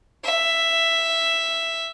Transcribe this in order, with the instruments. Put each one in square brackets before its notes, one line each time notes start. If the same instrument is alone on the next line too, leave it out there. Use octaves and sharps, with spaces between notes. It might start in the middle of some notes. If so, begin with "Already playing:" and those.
[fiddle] E5